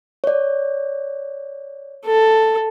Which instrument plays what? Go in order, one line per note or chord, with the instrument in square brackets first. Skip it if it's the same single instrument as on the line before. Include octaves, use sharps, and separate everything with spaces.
[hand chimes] C#5 D5
[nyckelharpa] A4